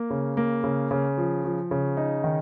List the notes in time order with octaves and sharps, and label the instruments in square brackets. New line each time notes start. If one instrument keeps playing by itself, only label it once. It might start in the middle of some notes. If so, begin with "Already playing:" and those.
Already playing: [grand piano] A#3
C#3
A#3
C#3
C#3
F3
F3
C#3
D#4
D#3